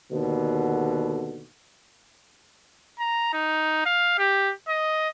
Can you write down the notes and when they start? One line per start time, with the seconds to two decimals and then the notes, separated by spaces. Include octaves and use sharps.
0.13 D#2 B2 D3
3.00 A#5
3.33 D#4
3.86 F5
4.19 G4
4.69 D#5